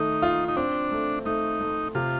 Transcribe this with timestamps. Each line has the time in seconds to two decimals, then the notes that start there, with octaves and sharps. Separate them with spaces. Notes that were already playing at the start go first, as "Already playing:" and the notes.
Already playing: D#3 A3 D#4
0.22 F4
0.48 D#4
0.57 C4 D4
0.92 A3
1.25 A3 D#4
1.60 A3
1.95 C3 F4